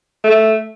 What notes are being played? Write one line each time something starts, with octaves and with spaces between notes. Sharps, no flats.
A3